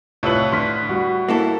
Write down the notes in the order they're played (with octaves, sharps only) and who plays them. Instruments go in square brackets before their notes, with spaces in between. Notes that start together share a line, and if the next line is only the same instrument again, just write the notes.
[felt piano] C2 F4 C#5 [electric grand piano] A2 B4 [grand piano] A5 E6 F#7
[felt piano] D3 [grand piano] C6 F6 B6
[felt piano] G3 [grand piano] F#4
[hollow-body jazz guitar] A#3 E4 A4